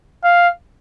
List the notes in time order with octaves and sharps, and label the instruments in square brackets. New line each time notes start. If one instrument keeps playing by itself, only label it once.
[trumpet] F5